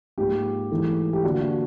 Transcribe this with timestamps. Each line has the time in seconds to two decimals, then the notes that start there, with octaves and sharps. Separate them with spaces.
0.18 G#2 F3 A#3 G4
0.71 G#2 E3 A3
1.13 G4
1.24 D3 F3 A#3 D4 F#4
1.41 F#4